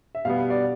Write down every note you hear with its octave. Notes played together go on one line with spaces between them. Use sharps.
E5
B2 G3 B3 F5
D5